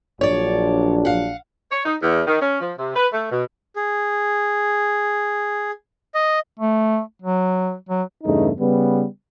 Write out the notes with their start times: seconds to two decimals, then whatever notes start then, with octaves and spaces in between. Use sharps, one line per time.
0.21 A#1 F#3 D4 C#5 D5
1.05 F5 F#5
1.71 C#5
1.85 D#4
2.02 E2
2.27 D#3
2.41 C#4
2.61 F3
2.78 C3
2.95 B4
3.13 A3
3.31 B2
3.76 G#4
6.15 D#5
6.60 A3
7.22 F#3
7.89 F#3
8.24 E2 G2 C#3 A3 D#4
8.59 C#3 G3 B3